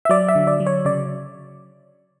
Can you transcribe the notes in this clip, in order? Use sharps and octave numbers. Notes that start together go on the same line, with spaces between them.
E5
F#3 D5
E5
D3
D5
F#3
C#5
C#3 D5